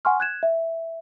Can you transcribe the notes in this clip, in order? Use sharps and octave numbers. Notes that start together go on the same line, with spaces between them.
F#5 G#5 C6 C#6 F6
F#6 G#6 E7
E5